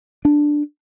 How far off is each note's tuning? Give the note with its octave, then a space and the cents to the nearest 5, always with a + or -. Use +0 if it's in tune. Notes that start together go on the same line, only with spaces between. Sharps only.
D4 +5